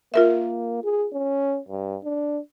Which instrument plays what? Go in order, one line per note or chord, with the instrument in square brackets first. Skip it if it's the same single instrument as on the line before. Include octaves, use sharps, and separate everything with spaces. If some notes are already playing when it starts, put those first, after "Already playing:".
[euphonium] A#3 [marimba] F4 A#4 E5
[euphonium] G#4
C#4
G2
D4